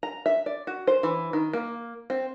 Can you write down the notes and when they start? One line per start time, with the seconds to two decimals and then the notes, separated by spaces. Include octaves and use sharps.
0.03 A#5
0.26 E5
0.46 D5
0.67 F#4
0.87 C5
1.03 E3
1.33 D#3
1.53 A#3
2.10 C4